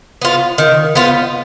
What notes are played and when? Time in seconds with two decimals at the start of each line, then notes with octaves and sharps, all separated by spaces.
0.22 B3 F4
0.58 D#3
0.95 B3 F4